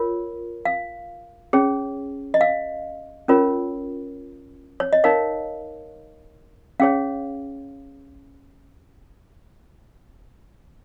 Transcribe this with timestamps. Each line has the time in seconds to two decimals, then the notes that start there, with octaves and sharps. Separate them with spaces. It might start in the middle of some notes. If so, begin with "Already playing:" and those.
Already playing: F4 A#4 C#5
0.65 F5
1.53 C#4 G#4 C#5
2.34 D#5
2.41 F5
3.28 C#4 F4 A#4 C#5
4.80 C#5
4.93 D#5
5.04 D#4 A#4 C#5 F5
6.80 C#4 G#4 C#5 F5